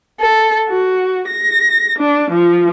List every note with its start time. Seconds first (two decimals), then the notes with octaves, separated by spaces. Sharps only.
0.20 A4
0.70 F#4
1.27 A#6
1.98 D4
2.31 F3